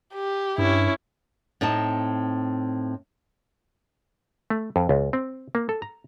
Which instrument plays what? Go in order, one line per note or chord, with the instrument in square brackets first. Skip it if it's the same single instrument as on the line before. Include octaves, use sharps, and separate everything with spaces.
[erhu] G4
[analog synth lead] G2 [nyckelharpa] C#4 E4
[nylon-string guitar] A2 C4 D#4 A5
[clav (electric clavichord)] A3
F2
C#2
C4
A#3
A4
A#5